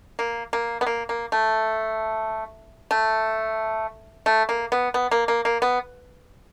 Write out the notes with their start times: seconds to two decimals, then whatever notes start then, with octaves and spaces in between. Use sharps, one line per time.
0.19 A#3
0.53 A#3
0.81 B3
0.86 A#3
1.09 A#3
1.32 A3
2.91 A3
4.26 A3
4.49 A#3
4.72 B3
4.94 B3
5.11 A#3
5.28 A#3
5.45 A#3
5.62 B3